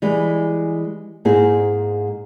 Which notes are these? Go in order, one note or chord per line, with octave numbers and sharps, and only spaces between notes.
E3 G3 G#3
G#2 A#3 C4 D#4 E4 G#4